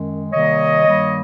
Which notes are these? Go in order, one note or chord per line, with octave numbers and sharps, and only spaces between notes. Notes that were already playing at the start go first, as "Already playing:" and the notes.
Already playing: F#2 D#3 G#3
C3 D#3 G3 A#3 C#5 D#5
G2 D#3 G3 A#3